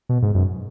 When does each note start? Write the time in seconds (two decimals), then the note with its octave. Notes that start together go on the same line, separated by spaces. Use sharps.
0.09 B2
0.22 G#2
0.34 F#2